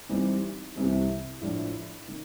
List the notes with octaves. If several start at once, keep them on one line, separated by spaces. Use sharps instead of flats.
E3 G3 C4 D#4
C2 C3 E3
A2 F3 A3 D4
D#3